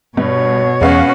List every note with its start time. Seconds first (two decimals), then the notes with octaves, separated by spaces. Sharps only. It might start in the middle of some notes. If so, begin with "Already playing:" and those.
0.17 G2 B2 B3 C#5
0.81 E2 G#3 B3 C#4 F#4 F5